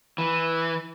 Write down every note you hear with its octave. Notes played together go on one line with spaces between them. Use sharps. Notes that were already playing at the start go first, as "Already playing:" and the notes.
E3